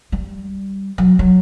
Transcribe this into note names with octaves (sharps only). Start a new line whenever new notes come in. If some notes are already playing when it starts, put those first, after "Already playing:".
G3
F#3
F#3